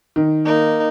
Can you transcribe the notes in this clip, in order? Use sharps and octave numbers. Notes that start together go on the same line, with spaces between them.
D#3
A#3 D#4